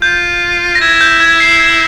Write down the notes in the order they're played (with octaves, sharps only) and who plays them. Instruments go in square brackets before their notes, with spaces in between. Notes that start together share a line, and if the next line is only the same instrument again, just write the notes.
[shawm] F4 [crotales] G6
[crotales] A#6
[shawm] E4 [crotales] G#6
[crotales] G6
G#6
C7
G#6